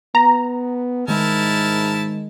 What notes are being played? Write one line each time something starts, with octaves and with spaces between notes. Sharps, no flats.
B3 A#5
G#2 D#3 G#3 E4 A#4 A5